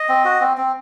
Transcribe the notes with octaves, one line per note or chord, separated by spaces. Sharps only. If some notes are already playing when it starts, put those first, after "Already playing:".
Already playing: D#5
C4
F#4
C4
C4